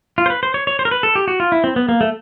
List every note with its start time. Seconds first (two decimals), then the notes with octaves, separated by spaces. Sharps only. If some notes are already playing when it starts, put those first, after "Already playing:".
0.18 F4
0.26 C5
0.30 B4
0.43 C5
0.54 C#5
0.67 C#5
0.79 C5
0.85 A#4
0.91 B4
1.03 A4
1.16 G4
1.28 F#4
1.40 F4
1.52 E4
1.64 C4
1.76 B3
1.89 A#3
2.01 A3